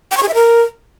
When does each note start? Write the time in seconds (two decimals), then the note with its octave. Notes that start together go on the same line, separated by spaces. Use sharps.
0.11 G5
0.17 C#6
0.23 G#4
0.29 E5
0.34 A#4